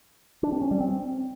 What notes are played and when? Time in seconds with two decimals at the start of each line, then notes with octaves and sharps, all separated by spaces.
0.43 D4
0.52 C4
0.62 C#4
0.71 G3
0.80 C4